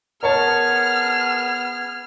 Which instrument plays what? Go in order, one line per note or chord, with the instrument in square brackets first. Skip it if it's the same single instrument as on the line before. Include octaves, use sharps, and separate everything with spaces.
[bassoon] B3 [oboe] G#4 [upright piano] A#4 C#5 A5 [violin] F6